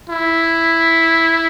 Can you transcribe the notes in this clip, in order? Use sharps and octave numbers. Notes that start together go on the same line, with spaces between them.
E4